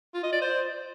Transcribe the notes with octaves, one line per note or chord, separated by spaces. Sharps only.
F4
D#5
D5
C5